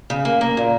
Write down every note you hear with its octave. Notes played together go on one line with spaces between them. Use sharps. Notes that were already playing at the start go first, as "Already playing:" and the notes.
C#3
A#3
A#3
A#2